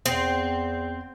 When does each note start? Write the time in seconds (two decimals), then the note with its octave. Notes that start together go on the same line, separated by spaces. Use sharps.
0.06 E2 C4